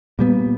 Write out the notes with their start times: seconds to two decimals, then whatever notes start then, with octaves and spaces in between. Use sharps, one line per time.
0.19 A#2 G3 B3